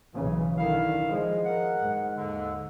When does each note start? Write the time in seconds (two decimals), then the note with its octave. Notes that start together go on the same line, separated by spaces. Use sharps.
0.14 B1 C#3 E3
0.58 D3 D#3 E4 F5
1.08 F3 G#3
1.45 A#4 F#5
1.80 G#2
2.16 D#2 D3